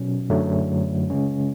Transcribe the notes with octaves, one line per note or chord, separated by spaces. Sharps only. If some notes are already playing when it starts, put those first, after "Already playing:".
Already playing: B2 F#3 C#4
F#2 D3 F#3 A3
C#3 G#3 C#4